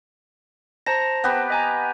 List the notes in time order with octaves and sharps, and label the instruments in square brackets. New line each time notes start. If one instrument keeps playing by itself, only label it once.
[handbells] C5 A5 A#6 [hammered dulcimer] A#5
[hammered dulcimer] B3 G4 B4
[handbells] D#5 G#5 A#5